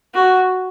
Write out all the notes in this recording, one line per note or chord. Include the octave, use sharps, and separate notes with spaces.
F#4